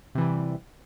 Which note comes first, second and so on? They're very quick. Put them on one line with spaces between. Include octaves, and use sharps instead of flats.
C3 E3 G3